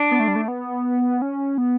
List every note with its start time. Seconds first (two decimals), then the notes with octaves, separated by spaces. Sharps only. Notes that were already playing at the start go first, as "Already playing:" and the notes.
Already playing: D4
0.11 B3
0.20 A3
0.28 G3
0.36 A3
0.48 B3
1.22 C#4
1.58 B3